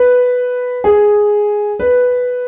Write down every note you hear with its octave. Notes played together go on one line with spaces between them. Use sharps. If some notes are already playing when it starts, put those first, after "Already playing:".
Already playing: B4
G#4
B4